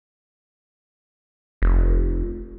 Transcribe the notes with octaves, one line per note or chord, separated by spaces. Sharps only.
F1